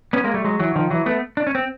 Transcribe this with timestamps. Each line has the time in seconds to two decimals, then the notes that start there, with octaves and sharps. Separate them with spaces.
0.13 B3 C#4
0.24 G#3 A#3
0.34 G3 A3
0.44 F#3 G#3
0.60 E3 F#3
0.76 D#3 F3
0.90 E3 F#3
1.06 A3 B3
1.37 D4
1.47 C#4
1.55 C4